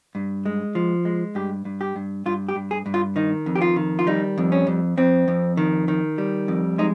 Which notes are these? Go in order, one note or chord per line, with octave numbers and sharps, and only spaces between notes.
G2
G#3
F3
G#3
G2 G4
G2
G4
G2
G2 F4
G4
G2
G#4
G2
F4
D#3 D#4
F2
G4
F4
D#3
F4
G3 D#4
F2
C#4
F2
F2 C4
F2
D#3
D#3
G3
F2
G#3 D#4